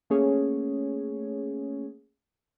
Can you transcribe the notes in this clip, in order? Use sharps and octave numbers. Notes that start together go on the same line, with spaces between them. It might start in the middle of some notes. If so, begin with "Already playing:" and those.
A3 A#3 C#4 G#4 C#5